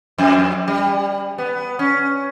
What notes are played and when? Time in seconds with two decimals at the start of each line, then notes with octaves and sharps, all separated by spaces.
0.18 F2
0.68 G3
1.38 B3
1.79 C#4